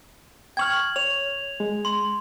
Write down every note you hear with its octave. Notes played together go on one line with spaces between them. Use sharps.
G5 C#6 F6 G#6 F#7
C#5 F7
G#3
C6